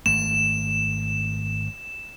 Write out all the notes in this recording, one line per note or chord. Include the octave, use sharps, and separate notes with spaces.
G#1 A3 E7